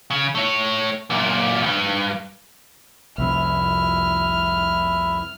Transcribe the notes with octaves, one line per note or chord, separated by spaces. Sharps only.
C#3
A3 C#5
F#2 A#2
C#2 G2
C2 F2 C3 E4 E5 F6